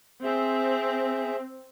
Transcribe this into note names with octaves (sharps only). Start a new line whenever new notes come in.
C4 G#4 E5